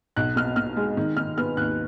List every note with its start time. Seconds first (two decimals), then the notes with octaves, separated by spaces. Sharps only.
0.16 B1 F#6
0.36 B2 F6
0.56 B2 F6
0.77 G#3
0.97 D#3
1.17 D#3 F6
1.38 B3 F6
1.57 D#2 F#6